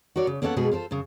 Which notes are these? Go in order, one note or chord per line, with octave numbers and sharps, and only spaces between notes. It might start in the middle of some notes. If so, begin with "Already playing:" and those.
F#4 A#4 C#5 D5
C#3
A#3 B3 C#4 A4 C#5 F#5
B2 G#3 A3 B3 F#4 G#4
F4 A4 A#4 C5
F#2 C#3